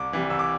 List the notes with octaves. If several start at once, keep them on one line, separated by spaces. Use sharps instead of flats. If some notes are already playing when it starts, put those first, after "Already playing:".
Already playing: C2 D6
C3 E3 G3
C2 E6
D6